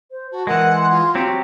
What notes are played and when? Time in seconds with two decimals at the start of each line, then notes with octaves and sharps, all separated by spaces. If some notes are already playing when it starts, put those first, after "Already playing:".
0.11 C5
0.32 F#4 A5
0.47 E3 G#3 A#4 F#5
0.74 C6
0.91 F4
1.15 F#3 C4 F#4 G4